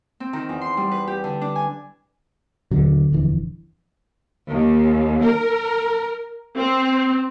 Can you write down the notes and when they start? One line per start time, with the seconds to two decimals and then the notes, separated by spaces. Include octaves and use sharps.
0.20 C4
0.33 D#3
0.49 E2
0.61 C6
0.77 G3
0.91 B4
1.07 G4
1.24 D3
1.41 D4
1.55 G#5
2.71 D#2 B2 D3 F#3
3.12 D#1 F2 E3
4.51 D#2
5.25 A#4
6.56 C4